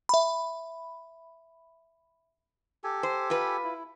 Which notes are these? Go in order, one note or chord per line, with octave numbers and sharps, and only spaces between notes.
E5 B5
G4 A4 G#5
C5
F4 B4
E4